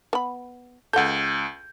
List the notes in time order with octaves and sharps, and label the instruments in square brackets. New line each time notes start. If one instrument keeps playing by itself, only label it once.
[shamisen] B3 B5
[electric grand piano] C#2 G6 [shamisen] A4 F#5